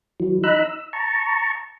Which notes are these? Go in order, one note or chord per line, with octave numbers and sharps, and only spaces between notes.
E3 F#3
D#4 A#5 B5 E6 F#6
E6
A5 A#5 C#6